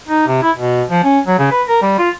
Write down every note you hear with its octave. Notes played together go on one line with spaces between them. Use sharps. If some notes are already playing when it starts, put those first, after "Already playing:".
D#4
C3
E4
B2
F3
C#4
F#3
C#3
B4
A#4
G3
F4